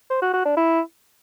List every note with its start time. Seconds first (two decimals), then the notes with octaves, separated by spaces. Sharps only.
0.10 C5
0.22 F#4
0.34 F#4
0.45 D4
0.57 E4